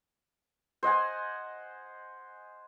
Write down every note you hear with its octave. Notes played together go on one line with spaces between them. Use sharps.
C5 D#5 F#5 G#5